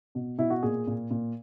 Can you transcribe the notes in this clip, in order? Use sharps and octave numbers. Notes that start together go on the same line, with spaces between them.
B2
B2 E4
F#4
A#2 G#4
A#2
A#2